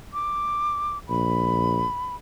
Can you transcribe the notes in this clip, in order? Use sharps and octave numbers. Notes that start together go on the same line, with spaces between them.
D6
A#1 B5